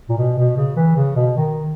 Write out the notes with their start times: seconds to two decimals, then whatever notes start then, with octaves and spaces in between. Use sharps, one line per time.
0.09 A#2
0.18 B2
0.38 B2
0.58 C#3
0.77 E3
0.97 C#3
1.16 B2
1.37 D#3